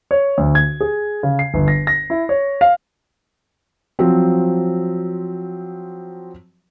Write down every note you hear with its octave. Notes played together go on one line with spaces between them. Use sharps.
C#5
D2
G#6
G#4
C#3
C7
G1
A#6
A#6
E4
C#5
F5
F3 F#3 C4